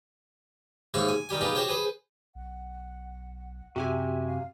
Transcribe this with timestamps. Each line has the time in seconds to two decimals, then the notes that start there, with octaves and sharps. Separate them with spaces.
0.94 D#2 G#2 G#3 E5 F5 C#6
1.08 G#5
1.29 D#3 G3 G4 G#5
1.41 B3 D#4 F4 G4 G#4
1.55 F#4 G4 C5 C#5 G5
1.68 G#4 B4 C5
2.35 B1 F#5
3.76 F#2 C3 F#4 G4 E5 G#5
4.26 F5